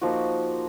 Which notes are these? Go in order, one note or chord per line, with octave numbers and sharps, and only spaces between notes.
F3 A#3 D#4 F#4